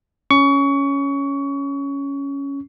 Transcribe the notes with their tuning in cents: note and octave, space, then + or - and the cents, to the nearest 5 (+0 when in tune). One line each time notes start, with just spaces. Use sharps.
C#4 +5 C#6 +25